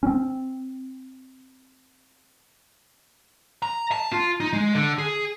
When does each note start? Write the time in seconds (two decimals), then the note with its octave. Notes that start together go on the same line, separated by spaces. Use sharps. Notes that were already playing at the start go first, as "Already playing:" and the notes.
0.03 C4 C#4
3.62 A#5
3.92 A5
4.12 F4
4.40 D#4
4.53 G#3
4.75 D3
4.98 G#4